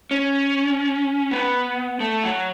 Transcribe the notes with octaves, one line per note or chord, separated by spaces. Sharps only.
C#4
B3
A3
F#3